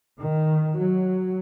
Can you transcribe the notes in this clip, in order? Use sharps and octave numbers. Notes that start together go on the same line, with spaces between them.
D#3
F#3